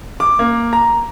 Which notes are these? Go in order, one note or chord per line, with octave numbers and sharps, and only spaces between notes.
D6
A#3
A#5